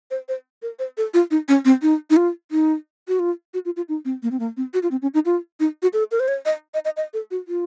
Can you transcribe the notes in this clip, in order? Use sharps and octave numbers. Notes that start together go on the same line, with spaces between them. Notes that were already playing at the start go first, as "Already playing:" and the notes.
C5
C5
A#4
C5
A4
F4
D#4
C#4
C4
D#4
D#4
F4
D#4
F#4
F4
F#4
F4
F4
D#4
C4
A#3
C4
A#3
C4
F#4
F4
C4
C#4
D#4
F4
D#4
F#4
A4
A#4
C5
C#5
D#5
D#5
D#5
D#5
A4
F#4
F4